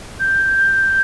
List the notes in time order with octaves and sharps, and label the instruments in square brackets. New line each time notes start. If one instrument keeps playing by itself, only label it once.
[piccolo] G6